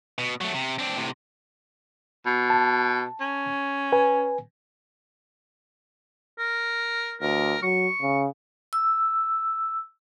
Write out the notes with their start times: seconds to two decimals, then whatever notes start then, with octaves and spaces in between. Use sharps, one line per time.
0.18 B2
0.41 F#3 A3
0.54 C3
0.79 C4 D4
0.97 A2 C3
2.26 B2
2.50 A5
3.21 C#4
3.92 B4 G#5
6.39 A#4
7.21 D2 A#4
7.63 F#3 C#6
8.02 C#3
8.73 E6